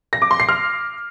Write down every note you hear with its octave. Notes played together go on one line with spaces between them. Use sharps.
A#6
D6
C6
C7
F6